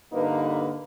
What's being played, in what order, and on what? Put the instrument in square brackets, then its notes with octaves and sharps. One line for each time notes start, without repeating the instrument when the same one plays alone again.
[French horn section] G2 D3 A#3 D#4 B4